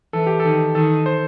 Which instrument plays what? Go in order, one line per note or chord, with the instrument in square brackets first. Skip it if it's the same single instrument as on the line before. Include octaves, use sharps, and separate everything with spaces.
[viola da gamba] E3 [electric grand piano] A4
[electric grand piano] G4
[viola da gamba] D#3 [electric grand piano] A4
[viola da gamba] D#3 [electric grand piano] A4
[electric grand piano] C5